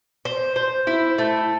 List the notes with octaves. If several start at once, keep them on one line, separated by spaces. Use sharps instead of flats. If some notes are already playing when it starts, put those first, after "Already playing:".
C5
C5
E4
A3